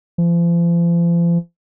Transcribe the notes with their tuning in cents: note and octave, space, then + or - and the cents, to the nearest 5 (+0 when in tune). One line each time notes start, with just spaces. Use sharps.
F3 -40